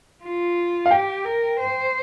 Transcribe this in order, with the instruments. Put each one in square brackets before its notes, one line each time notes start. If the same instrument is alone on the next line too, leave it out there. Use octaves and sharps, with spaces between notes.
[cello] F4
[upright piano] F5
[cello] G4 [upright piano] G5
[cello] A#4
C5